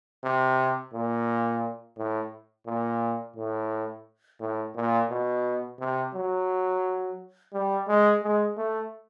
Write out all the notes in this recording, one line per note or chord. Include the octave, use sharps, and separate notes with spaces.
C3
A#2
A2
A#2
A2
A2
A#2
B2
C3
F#3
G3
G#3
G#3
A3